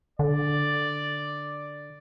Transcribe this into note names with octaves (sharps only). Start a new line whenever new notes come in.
D3 D5